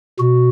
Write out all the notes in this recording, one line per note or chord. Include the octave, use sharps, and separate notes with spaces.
B2 F#4